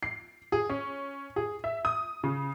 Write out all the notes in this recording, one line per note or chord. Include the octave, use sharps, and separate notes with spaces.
C7
G#4
C#4
G#4
E5
D#6
C#3